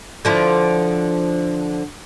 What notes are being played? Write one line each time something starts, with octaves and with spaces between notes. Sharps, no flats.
D3 F3 E4